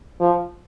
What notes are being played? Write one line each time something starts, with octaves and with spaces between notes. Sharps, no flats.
F3